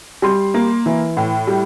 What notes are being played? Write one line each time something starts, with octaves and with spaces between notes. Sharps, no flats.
G3 C6
A#3
E3
A2
G3